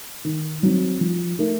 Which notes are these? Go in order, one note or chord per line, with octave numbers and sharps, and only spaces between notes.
D#3
F#3 C4 D#4
F3
A3 D#4 A#4